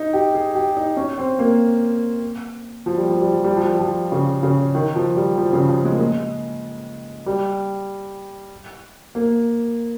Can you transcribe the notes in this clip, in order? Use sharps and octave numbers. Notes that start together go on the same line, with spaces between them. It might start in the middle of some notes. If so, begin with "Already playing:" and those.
Already playing: D#4
G4
G#4
G4
D#4
C#4
C4
A#3
F3
G3
F3
G3
F3
G3
F3
G3
F3
C#3
C#3
D#3
F3
G3
F3
C#3
F3
G#3
A#3
G#3
G3
A#3